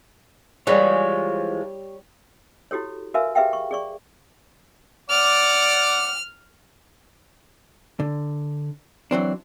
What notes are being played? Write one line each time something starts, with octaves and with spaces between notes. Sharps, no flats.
E3 F3 G3 G#3 G4 C#5 F#5
E4 F#4 G4 A4 C#5
F#4 A#4 B4 E5 F5 G#5
G4 G#4 B4 E5 F5 G5
C#6
G#4 D5 C#6
D5 F#5 D6 F6
D3
E3 F#3 C4 D4